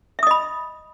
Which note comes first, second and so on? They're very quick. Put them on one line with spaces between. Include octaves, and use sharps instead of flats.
E5 D#6 D#5 B5